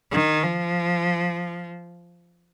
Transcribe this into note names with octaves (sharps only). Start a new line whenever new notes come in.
D#3
F3